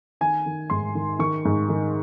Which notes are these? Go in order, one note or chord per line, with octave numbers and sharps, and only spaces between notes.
D#3 G#5
D#3
G#2 C6
D#3
D#3 C#6
G#2
D#3